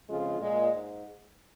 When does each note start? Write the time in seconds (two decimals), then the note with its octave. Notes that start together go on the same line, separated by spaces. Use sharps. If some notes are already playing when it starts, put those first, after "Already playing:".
0.09 F2 C#3 G#3 F4 G#4
0.40 A#2 G#3
0.71 G#2